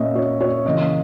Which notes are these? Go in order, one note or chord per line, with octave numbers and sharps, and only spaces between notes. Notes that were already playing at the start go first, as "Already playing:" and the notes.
Already playing: A#2 A#3 C#4 C#5 D#5 E5
C#5
C#5
C#3 E3 A#3 D#5